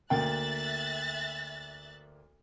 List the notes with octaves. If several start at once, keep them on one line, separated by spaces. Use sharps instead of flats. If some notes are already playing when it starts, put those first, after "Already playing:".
D2 A#3 E5 G5 F#6 A6